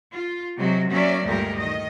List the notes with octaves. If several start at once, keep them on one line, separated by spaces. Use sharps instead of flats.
F4
C3 F#3 G#3 F#4
F#3 A#3 C#4 D5 E5
D2 G2 A#2 G#3 G4 A#4
D#3 D#5